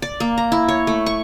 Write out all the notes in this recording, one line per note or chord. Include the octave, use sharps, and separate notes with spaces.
D5
A#3
A#5
E4
C#5
A3
C#6